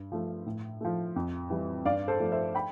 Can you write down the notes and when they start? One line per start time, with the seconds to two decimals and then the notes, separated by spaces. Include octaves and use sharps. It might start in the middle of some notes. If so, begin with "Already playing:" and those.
Already playing: G2
0.12 F3 A3
0.46 A2
0.81 F3 A3
1.16 F2
1.50 E3 G3
1.85 G2 D5 F5
2.08 A4 C5
2.20 F3 A3
2.32 C5 E5
2.55 G5 B5